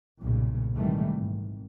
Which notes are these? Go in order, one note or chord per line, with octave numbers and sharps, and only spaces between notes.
B1 G2 A#2 C#3
G#2 C3 D#3 E3 G3 A3
G#1